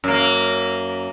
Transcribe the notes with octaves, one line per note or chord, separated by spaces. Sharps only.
F#2 A#3